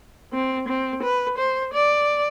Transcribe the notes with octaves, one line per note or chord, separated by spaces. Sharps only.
C4
C4
B4
C5
D5